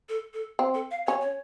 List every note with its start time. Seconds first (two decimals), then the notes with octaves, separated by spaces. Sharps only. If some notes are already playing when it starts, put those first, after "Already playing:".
0.09 A4
0.34 A4
0.59 C4
0.74 A4
0.91 F5
1.07 C#4 C#5
1.21 C#5